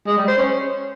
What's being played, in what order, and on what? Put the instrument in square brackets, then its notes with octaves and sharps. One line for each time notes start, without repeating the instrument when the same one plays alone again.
[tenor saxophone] G#3
G3
C5
C#4